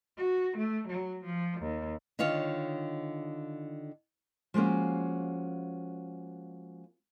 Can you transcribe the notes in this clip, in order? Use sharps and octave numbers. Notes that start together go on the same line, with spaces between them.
F#4
A3
F#3
F3
D#2
D3 D#3 F4 C#5 F5
F3 G#3 A#3 C#4 F#4